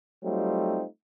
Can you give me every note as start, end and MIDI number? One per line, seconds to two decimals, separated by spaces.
0.24 0.83 54
0.24 0.83 55
0.24 0.83 57
0.24 0.83 60
0.24 0.83 63
0.24 0.83 65